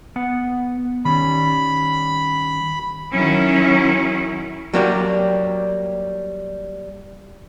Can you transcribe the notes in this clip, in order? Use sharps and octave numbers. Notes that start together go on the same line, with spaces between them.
B3 F#5
D#3 G3 C#4 B5
D#3 F#3 C#4 E4
F#3 G3 A#3 D4 F#4 G4